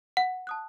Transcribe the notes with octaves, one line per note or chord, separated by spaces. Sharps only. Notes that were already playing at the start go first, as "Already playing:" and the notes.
F#5
A5 D#6 F#6